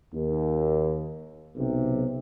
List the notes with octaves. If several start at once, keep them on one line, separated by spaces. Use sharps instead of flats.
D#2
B1 C3